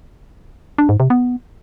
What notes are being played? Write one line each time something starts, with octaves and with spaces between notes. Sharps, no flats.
D4
G#2
C3
B3